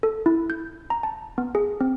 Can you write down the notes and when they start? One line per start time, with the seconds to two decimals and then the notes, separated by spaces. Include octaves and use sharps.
0.03 A4
0.26 E4
0.50 G6
0.90 A#5
1.03 A5
1.38 B3
1.55 G#4
1.81 C4